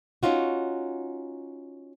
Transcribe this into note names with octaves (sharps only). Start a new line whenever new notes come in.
C#4 D#4 F4 F#4